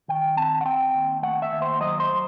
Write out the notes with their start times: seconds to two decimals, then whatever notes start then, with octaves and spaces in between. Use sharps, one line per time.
0.08 D#3 G5
0.37 C4 A5
0.61 F#5
0.65 C4 G5
0.95 D#2
1.23 A3 F#5
1.42 E5
1.52 D#2
1.62 C5
1.80 F#3 D#5
2.00 C5